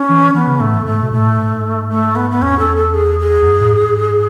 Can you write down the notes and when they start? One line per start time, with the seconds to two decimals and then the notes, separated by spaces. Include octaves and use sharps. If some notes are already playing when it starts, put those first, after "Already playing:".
Already playing: C#4
0.09 E3
0.34 E3 B3
0.47 C#3
0.60 A2 A3
0.73 G#2
0.86 G#2 A3
1.02 B2
1.12 A2 A3
1.38 G#2
1.90 A3
2.16 B3
2.31 B3
2.42 E2 C#4
2.59 A4
2.77 A4
2.94 G#4
3.19 G#4
3.42 E2
3.46 F#2
3.60 A2
3.71 G#2